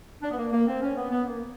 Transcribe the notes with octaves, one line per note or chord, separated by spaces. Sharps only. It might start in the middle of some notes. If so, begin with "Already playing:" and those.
D4
B3
A#3
A#3
C4
C#4
B3
B3
A#3